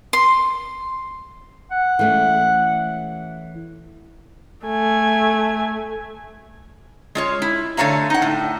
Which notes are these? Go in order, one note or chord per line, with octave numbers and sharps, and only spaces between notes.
C6
F#5
E3 A3 C#4
A3 G#5
G#3 F4 C#5
E4
D3 A3 C#5 F5 A#5
D#4 F#5
A2